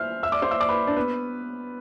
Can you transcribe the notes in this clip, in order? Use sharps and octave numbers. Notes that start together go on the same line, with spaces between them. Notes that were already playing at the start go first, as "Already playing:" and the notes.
Already playing: C5 E5 F6
E5 E6
D5 D6
C5 C6
E5 E6
D5 D6
B4 B5
D4 D5
B3 B4